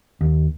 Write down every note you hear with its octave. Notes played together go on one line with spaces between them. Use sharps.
D#2